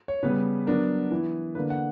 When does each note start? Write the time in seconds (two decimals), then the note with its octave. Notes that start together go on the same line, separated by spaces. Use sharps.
0.08 C#5
0.23 C#3 G3 B3 B4
0.67 F#3 B3 D4 A#4
1.11 E3 B3 E4
1.55 D3 A#3 D4 B4
1.70 F#5